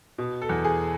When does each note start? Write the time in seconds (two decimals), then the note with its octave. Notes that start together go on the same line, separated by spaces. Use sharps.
0.18 B2
0.42 A4
0.49 E2
0.65 G#4